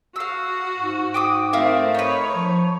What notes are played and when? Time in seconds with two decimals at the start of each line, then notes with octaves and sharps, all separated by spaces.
0.16 F#4 F5 E6
0.78 G#2
1.14 G5 D6 D#6
1.53 A3 C4 A#4 E5 F5
1.95 D#4 B4 C#5
2.35 F3